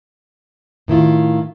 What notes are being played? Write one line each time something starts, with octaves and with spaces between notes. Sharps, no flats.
A2 D#3 E4 F4